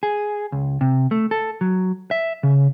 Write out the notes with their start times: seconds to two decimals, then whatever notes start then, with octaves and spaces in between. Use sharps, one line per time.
0.03 G#4
0.52 C#2
0.81 C3
1.11 A3
1.31 A4
1.61 F#3
2.11 E5
2.43 C#3